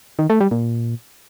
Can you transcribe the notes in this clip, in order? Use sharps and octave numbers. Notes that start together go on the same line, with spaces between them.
D#3
A3
G3
A#2